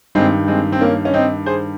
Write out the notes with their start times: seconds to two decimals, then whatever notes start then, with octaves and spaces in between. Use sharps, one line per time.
0.15 G2 D#3 G#3 C4
0.48 G#3 C4
0.72 C4
0.81 A#3 C#4
1.05 C#4
1.14 C4 D#4
1.46 G#4 C5